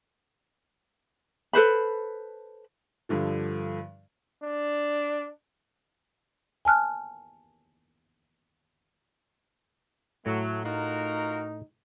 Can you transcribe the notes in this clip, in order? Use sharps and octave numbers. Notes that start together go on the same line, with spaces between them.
A4 B4 C5 B5
G2 D3 F3
D4
G#5 A5 F6 F#6
A2 F#3 A3
D#4 F4 F#4 A#4